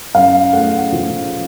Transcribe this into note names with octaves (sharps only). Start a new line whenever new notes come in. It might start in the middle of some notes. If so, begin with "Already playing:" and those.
F#2 F5
A3 F#5
F3